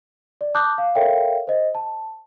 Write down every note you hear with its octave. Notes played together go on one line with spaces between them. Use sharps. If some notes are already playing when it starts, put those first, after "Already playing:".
D5
A5 D6 D#6 F#6 G6
F5
A4 A#4 C#5 E5 F5 G5
C5 D#5
A5